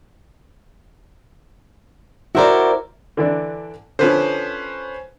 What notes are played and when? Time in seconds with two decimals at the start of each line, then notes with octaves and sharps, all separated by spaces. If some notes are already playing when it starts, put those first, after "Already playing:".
2.35 E4 F#4 A#4 C5 D5
3.17 D3 E3 D4
3.99 D3 F3 C#4 B4 C5